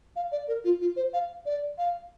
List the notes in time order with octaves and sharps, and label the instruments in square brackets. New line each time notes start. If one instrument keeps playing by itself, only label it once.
[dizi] F5
D5
A#4
F4
F4
C5
F5
D5
F5